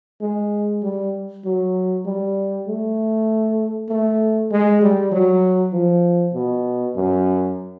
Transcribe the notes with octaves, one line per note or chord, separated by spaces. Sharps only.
G#3
G3
F#3
G3
A3
A3
G#3
G3
F#3
F3
B2
F#2